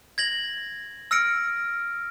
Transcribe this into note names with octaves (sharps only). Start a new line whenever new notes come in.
G#6 A#6 F#7
E6 F6 A#6 C#7 D7